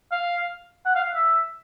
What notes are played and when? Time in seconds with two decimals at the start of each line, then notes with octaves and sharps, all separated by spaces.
0.11 F5
0.85 F#5
0.95 F5
1.15 E5